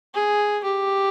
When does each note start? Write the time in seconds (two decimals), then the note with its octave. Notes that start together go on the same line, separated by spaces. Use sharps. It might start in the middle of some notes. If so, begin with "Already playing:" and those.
0.14 G#4
0.64 G4